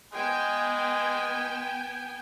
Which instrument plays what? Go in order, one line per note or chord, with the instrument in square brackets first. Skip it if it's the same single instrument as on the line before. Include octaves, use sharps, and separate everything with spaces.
[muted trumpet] G#3 [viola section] B3 G5 G#5